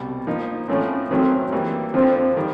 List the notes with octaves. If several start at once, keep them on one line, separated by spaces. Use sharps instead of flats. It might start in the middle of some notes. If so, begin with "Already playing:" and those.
Already playing: C2 B2 G3
F3 A#3 D#4
A2 F3 A3 C4 C#4
F#2 D#3 F#3 A3 C4 C#4
E3 G3 A#3
F2 D3 F3 C4
D#3 G3